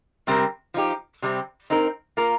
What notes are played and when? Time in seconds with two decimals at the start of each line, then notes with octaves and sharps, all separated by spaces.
0.27 C3 G3 C4 G4 A#4
0.74 F3 D#4 G4
1.22 C3 G3 C4
1.70 C4 D#4 A#4
2.17 A#3 F4 A#4